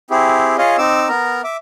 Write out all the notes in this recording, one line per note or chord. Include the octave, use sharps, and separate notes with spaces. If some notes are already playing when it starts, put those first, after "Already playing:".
C4 E4 G4 G#4
F4 G#4 C#5 D#5 F5
C4 D#4 D6 E6
B3 A#4 A#5
E5 D6